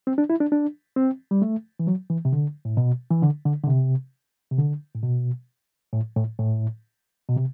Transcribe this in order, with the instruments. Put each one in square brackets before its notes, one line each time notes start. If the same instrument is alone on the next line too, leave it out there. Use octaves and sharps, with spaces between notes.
[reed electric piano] C4
D4
E4
D4
D4
C4
G3
A3
E3
F#3
E3
C3
D3
A2
B2
E3
D3
D3
D3
C3
C3
D3
A2
B2
A2
A2
A2
B2
C3